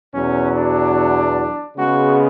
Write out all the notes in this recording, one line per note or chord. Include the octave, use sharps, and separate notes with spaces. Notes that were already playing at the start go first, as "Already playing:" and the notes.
E2 B2 F#3 C#4
D4
C#3 G#3 B3 F#4